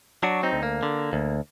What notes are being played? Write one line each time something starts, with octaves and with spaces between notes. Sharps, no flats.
F#3 D4 F#4
C4 D#4
D2
A#3
D3
D2